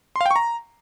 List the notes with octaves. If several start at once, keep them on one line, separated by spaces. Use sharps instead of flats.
C6
F5
G5
C#6
A#5